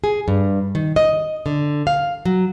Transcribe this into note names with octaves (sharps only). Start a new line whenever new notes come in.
G#4
G2
D#3
D#5
D3
F5
F#3